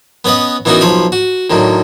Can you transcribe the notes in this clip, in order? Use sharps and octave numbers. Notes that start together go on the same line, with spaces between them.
B3 C#4 B4 D#5 F#5
E3 B3 C#4 D#4 F#4 A#4
B1 F3 C#5 B5
F#4
A2 D3 D#3 F#3